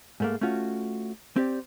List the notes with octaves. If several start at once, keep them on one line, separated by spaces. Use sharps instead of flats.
G#2 A3 A#3
A3 C#4 F4 F#4
C4 G4 D5